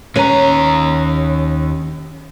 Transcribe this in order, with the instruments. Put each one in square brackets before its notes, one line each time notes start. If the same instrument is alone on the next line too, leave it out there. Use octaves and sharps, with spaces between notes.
[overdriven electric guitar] D#2 A#5 [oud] C#4 B4